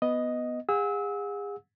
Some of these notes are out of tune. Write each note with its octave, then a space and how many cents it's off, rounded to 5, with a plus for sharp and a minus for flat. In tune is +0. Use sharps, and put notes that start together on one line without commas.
B3 +0 D#5 +0
G#4 -35 F#5 -40 E6 -30